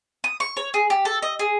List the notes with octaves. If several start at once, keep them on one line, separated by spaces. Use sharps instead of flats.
D#6
C#6
C#5
G#4
G4
A4
D#5
G#4